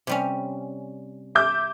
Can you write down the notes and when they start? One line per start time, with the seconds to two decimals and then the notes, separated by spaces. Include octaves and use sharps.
0.07 C3 G3 C#4
1.35 E5 D6 G6